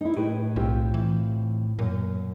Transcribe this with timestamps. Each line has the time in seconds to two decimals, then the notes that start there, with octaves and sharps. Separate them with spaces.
0.01 D#4 E4
0.17 A2 G4 B4
0.56 B1 C4 F4 G4
0.94 E3
1.79 F#2 A#2